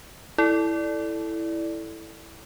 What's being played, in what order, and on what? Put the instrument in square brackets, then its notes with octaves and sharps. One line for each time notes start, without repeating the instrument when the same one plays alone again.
[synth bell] E4 A4 D5